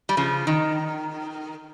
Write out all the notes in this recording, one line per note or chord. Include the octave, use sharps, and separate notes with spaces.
G3
C#3 F3
D#3